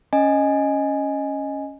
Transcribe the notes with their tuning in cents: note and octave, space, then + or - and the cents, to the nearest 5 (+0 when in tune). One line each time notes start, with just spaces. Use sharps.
C#4 +0 D#5 +0 G#5 +0